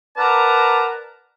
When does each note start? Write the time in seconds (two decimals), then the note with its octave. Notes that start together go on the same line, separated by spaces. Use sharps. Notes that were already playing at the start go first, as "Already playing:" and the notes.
0.17 A#4 B4 D5 F#5 A5 A#5